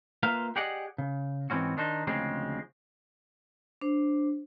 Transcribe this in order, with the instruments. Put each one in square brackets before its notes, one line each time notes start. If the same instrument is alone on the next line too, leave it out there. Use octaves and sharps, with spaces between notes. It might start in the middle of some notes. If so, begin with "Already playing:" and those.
[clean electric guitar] A#3 F4 B4 C5 E5 F5
G4 G#4 D5 D#5 F#5
C#3
G#2 E3 C4 C#4 F#4
D#3 D4 D#4 C5
D2 C#3 F3 G#3 C4
[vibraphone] D4 C5